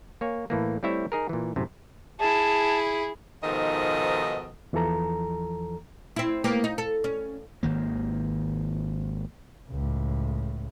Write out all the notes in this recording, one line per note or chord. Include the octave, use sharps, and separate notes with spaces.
A#3 C#5 G#5
A2 E3 A#3
G3 A3 C4 E4 C#5 E5
D#4 G#4 A#4
A#2 E3
F#2 A2 C3
E4 G#4 A5
G#2 B2 D#3 F3 A4 D#5
E2 E3 F3 A4 A#5
C4 E4
A#3 B3 G4
D#4
A4
C#4
G#1 D#3 A#3
C#2 A2